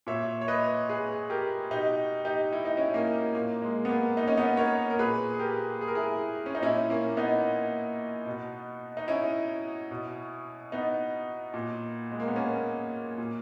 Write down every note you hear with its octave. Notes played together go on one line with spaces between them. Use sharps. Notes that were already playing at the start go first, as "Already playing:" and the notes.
A#2 C#5 E5
C#5
B4 D#5
G#4 B4
G4 A#4
B2 D#4 G4
D#4 G4
E4
D#4
C#4 E4
A#3 C#4
A#2 A#3
G#3
B3
A#3
D#4
C#4
B3 D#4
A#4 C#5
A#4
A#2 G#4 B4
G#4
G4 A#4
G#4
A#4
E4 G#4
C#4
D#4
A#2 C#4 E4
A#3 C#4
B3 D#4
B2
D#4
C#4 E4
B2
B3 D#4
A#2
G#3
A#3
B3
A#3 C#4
A#2